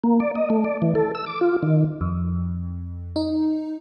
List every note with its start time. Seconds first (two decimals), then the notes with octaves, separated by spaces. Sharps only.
0.04 A#3
0.20 D5
0.35 D#5
0.50 A3
0.64 D5
0.82 E3
0.95 A4
1.15 E6
1.26 D6
1.41 F4
1.63 D#3
2.01 F2
3.16 D#4